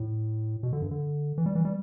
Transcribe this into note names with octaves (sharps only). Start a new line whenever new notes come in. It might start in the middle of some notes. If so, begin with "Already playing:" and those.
Already playing: A2
B2
D3
G2
D3
E3
G3
E3
G3